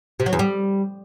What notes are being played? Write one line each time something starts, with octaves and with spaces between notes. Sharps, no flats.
C3
F#3
E2
G3